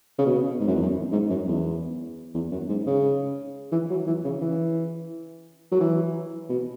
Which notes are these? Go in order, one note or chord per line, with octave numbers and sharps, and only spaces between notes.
C#3
B2
G#2
F#2
E2
F#2
G#2
F#2
E2
E2
F#2
G#2
C#3
E3
F#3
E3
C#3
E3
F#3
E3
B2